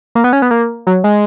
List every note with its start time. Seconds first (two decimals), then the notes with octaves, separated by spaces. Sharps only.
0.15 A#3
0.24 B3
0.33 C#4
0.42 B3
0.51 A#3
0.87 F#3
1.04 G#3